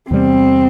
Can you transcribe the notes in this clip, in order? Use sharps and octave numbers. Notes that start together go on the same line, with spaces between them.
E2 C3 G3 B3 C4